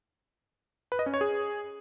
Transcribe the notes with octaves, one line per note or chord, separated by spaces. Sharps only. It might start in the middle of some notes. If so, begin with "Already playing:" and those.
B4
D#5
C#4
C#5
G#4